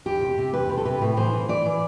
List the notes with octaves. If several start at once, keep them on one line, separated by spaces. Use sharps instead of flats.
E2 G4
C3
C3
E2 B4
C3
A4
C3 B4
A2 B4
E3 C5
E3
E3 D5
E3